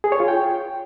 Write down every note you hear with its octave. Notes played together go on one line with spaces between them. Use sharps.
G#4
C#5
F4
G5